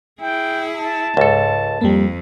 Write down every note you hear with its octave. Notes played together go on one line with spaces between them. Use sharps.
E4 G#4 G5
A5
C#2 G#2 A4
F2 G3 A#3